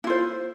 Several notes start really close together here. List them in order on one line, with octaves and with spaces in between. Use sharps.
E4 F4 C5